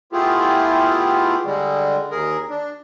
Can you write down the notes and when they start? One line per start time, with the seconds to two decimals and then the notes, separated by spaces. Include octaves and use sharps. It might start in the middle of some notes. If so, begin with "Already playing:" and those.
0.13 A3 B3 E4 F4 G4 G#4
1.44 D3 G3 G#3
2.11 D#2 G#4 A#4
2.49 D4